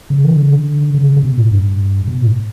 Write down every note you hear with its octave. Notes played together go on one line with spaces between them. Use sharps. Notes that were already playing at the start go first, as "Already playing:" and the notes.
C#3
E3
D3
C#3
D3
C#3
C#3
B2
A2
G2
B2
A2